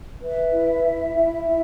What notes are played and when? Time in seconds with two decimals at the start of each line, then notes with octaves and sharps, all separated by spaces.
0.21 B4 E5
0.52 E4
0.83 E4
1.14 E4
1.45 E4